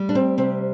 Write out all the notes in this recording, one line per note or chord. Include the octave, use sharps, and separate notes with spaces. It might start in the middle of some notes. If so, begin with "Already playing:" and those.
Already playing: G3
D4
C4
C3 C4